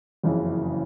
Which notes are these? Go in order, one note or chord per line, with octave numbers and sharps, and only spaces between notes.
F#1 F2 C#3 E3